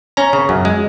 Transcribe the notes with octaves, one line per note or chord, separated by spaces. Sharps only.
C#4 A#5
C#3
F#2
G#3